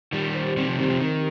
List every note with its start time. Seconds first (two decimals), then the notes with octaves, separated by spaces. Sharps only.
0.13 D#3 G3 G4
0.35 C5
0.57 D#3 G3 C4
0.68 C3 F3
0.79 D#3 G3 G4
0.89 C3 F3
1.01 D#3 A#4